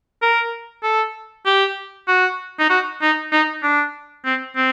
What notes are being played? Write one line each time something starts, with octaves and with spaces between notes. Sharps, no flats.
A#4
A4
G4
F#4
D#4
F#4
D#4
D#4
D4
C4
C4